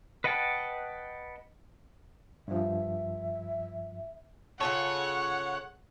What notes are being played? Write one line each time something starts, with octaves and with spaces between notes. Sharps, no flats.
B4 D#5 F#5 G5 A5
G2 F3 E5
C#3 F4 A4 C#5 F#5